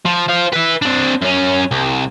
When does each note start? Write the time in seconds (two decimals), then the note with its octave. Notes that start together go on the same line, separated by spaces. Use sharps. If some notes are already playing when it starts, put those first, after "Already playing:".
0.05 F3
0.29 C5 F5
0.53 B4 E5
0.82 C4 D4
1.21 F#2 C#4
1.71 C2